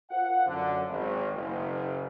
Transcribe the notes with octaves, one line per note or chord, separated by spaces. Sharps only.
F4 A#4 C5 F5 F#5
F#2 D3
G#1
F#1